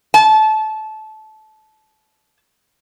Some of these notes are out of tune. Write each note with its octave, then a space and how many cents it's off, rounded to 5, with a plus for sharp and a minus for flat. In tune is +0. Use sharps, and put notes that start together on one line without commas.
A5 -20